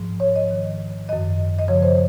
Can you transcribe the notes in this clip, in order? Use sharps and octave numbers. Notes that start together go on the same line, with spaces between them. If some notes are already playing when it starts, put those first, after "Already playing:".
Already playing: G#2 F3
C#5
D#5
G#2 D#3
F#2 D#3 D#5
D#5
F#2 C#3 F3 C#5
C5